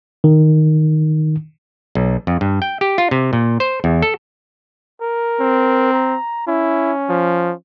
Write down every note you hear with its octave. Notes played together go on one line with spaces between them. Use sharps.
D#3
B1
F2
G2
G5
G4
F4
C3
A#2
C5
E2
A4
A#4
C4
A#5
C#4 E4
F3